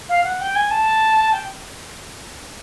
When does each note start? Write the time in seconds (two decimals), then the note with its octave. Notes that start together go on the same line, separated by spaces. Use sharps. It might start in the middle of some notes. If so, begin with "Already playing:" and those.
0.09 F5
0.24 F#5
0.41 G5
0.56 G#5
0.71 A5
1.33 G5